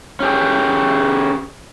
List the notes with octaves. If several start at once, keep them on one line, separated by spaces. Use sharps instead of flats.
C#4 G4 G#4